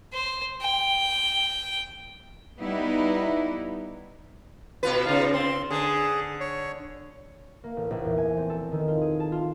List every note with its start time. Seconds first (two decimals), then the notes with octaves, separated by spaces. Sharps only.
0.13 C5
0.61 G5
2.60 G3 B3 D#4 E4
4.83 B2 F4 B4
5.05 C#3 D#4 F4 F5
5.34 C4 C6
5.71 D3 G#4
6.40 C#5
7.64 A#3
7.77 A1
7.91 A#1
8.04 E2
8.18 G#5
8.37 C4
8.50 A4
8.72 D#3
8.88 F4
9.01 G#4
9.20 A5
9.32 F4